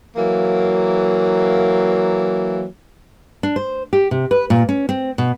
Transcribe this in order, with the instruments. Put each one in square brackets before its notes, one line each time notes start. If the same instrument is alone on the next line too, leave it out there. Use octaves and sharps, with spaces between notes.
[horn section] E3 F#3 A#3
[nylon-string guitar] D4
C5
G4
C3
B4
A#2
C#4
C4
B2